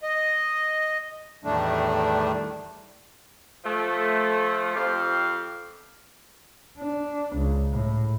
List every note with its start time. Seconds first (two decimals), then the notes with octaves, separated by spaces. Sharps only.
0.03 D#5
1.44 E2 A2 D#3 G3 A3 D4
3.64 F3 A3
4.74 F2 G4 C5 F5
6.78 D4
7.36 C#2
7.72 A2